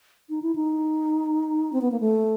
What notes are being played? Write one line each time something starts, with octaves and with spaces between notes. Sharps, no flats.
D#4
E4
D#4
C4
B3
A#3
A3